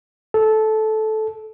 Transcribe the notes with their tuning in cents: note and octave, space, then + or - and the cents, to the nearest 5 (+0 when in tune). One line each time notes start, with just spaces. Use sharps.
A4 -15